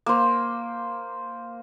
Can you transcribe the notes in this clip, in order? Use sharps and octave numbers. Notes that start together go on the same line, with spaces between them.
A#3 C5